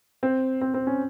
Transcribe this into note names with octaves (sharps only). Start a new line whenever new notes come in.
C4
C4
C4
C#4